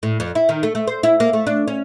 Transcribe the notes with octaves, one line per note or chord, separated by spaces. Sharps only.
A2
F2
E4
D#3
A3
A3
C5
E4
A#3
A3
D4
C#4